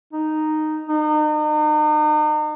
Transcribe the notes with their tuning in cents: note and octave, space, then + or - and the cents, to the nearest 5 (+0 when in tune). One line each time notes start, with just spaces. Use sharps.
D#4 -5
D#4 -40